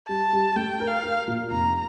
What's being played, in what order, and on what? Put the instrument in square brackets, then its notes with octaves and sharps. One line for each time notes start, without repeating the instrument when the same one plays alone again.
[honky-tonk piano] G3 [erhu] A5
[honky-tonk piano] G3
[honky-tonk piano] A3 [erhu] G5
[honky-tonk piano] A#4
[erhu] F5
[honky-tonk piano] A#4
A#2
[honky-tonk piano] F1 [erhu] A#5